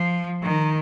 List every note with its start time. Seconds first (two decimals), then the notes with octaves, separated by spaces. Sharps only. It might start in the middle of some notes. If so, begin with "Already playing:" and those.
Already playing: F3
0.42 D#3